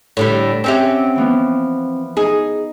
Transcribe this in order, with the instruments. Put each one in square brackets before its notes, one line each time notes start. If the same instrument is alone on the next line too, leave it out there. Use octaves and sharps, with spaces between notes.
[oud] A2 D3 G3
[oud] C4 C#4 G4 [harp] E5 F#5 G5
[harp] E3 F3 B3
[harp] D#4 [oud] G#4